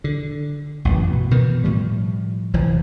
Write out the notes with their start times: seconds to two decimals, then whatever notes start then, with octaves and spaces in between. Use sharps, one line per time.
0.04 D3
0.85 A1 F#2 C3 E3
1.09 B2
1.31 B2 D#3 E3
1.64 A2 F3 G3
2.54 F1 E3 F3